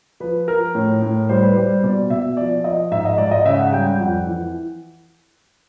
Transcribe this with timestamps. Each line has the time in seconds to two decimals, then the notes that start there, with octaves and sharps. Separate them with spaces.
0.20 F3 B4
0.48 F3 A#4
0.75 A2
1.02 A2
1.29 G3 C5
1.43 B4
1.56 G3 C5
1.83 B2 D5
2.10 B2 E5
2.37 F3 D5
2.64 F3 D#5
2.91 G#2 E5
3.05 D#5
3.18 G#2 D5
3.31 D#5
3.45 C#3 E5
3.59 F#5
3.72 G3 G5
3.86 G5
3.99 F2 F#5
4.27 E3